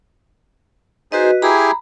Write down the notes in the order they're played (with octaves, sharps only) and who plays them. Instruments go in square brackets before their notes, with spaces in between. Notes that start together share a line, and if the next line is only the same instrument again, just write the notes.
[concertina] D#4 G#4 C5 [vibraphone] F#4 B4 D#5
[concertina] E4 G4 G#4 [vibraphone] A#5 B5